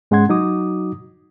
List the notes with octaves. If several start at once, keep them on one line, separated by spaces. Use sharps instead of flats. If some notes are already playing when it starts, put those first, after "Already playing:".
G#2 G#3 C#4 F#5 C6 G#6
F#3 D#4 F#4 D6 D#6